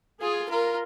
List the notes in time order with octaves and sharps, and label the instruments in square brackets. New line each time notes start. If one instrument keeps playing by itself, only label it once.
[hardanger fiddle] F4 [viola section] G#4
[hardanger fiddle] F4 [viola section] A#4